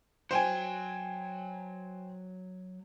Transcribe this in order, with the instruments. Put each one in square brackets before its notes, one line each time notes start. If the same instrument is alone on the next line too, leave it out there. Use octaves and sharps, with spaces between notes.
[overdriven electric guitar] F#3 [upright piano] C5 G5 G#5